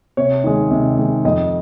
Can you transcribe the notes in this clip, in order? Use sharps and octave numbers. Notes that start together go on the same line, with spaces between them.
C3 C#5
D#3 G#3
C3
D#3 G#3
F2 D#5